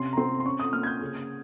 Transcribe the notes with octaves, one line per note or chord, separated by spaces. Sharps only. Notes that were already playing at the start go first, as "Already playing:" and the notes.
Already playing: C3 C#4 C6
A#5
C4 C6
C6
C#4 C#6
D#6
A#3 F6
G#6
G6
C#3